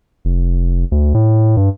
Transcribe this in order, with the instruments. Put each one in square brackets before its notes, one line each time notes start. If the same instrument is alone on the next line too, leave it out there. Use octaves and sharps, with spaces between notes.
[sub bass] F1
D2
A2
G2